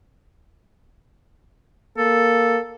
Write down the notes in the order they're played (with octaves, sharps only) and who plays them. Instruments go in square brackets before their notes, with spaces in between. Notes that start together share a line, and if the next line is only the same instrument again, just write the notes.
[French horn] A#3 [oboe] A4